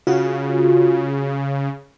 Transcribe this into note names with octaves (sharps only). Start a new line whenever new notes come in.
C#3 F4 F#4